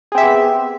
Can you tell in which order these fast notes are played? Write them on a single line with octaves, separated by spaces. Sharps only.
G#4 C4 E5 G4 B3